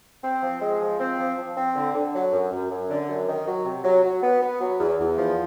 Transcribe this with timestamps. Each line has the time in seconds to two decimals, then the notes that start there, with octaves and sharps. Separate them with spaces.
0.23 C4
0.42 F3
0.61 G#3
0.80 F3
0.99 C4
1.19 F3
1.38 F3
1.56 C4
1.75 D3
1.95 D3
2.14 F#3
2.32 F#2
2.52 F#2
2.71 F#2
2.89 D3
3.09 F#2
3.27 D#3
3.47 F#3
3.65 C3
3.84 F#3
4.03 F#3
4.22 B3
4.42 B3
4.61 F#3
4.79 E2
4.98 E2
5.17 F3